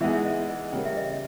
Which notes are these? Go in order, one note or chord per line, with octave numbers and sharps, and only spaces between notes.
E3 G#3 B3 D#4 G#4 E5
E5
D#5
D#5
C#3 G3 A#3 G5
E5
D#5